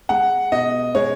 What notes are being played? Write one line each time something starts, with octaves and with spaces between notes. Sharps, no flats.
G#3 F#5
B2 D#5
G#3 C#5